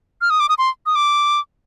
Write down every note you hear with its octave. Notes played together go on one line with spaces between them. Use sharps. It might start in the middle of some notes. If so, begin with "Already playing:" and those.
F6
D#6
D6
D#6
C6
D#6
D6